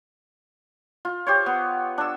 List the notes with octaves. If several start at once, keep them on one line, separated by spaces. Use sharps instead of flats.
F4
G4 C5 C#5
B3
D4 E6